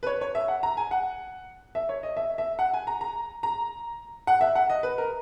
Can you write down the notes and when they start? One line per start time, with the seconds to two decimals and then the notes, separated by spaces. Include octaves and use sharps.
0.03 B4
0.07 C#5
0.21 C#5
0.35 E5
0.48 F#5
0.63 A#5
0.77 G#5
0.91 F#5
1.75 E5
1.89 C#5
2.03 D#5
2.17 E5
2.38 E5
2.59 F#5
2.73 G#5
2.87 A#5
3.01 A#5
3.43 A#5
4.27 F#5
4.41 E5
4.55 F#5
4.69 D#5
4.83 B4
4.98 A#4